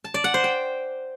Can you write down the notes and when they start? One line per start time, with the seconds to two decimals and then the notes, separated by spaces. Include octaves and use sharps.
0.04 A5
0.14 D5
0.24 F#5
0.34 C5
0.44 G5